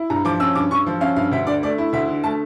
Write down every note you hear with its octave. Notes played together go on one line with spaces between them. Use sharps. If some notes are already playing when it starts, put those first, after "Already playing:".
Already playing: E4
G2 A#5
F3 D6
C#4 E6
G2 D6
G2 C#6
F3
C#4 F5
G2 F5
D2 E5
D3 D5
A3 D5
E4
D2 E5
D3
A3 A5